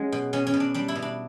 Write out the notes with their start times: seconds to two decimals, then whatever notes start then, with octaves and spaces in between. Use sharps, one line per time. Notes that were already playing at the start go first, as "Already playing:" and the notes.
Already playing: F#3 G#3 C#4
0.12 B2
0.33 B2 C#4
0.47 C#4
0.54 B2
0.60 D4
0.74 G3 D4
0.88 E4
0.95 B2
1.02 D4